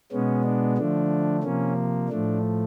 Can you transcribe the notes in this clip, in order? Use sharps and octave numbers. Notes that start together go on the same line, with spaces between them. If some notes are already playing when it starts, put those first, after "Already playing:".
B2 G#3 B3 C#4
D4
D3 F3 A3 D4
C3 F3 A#3 C#4
A2 F3 A3 D4